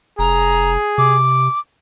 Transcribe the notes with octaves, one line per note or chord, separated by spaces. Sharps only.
F1 G#4 A#5
C3 D6